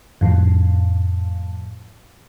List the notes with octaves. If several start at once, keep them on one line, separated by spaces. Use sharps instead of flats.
F2 A2